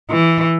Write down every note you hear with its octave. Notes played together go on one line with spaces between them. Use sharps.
E3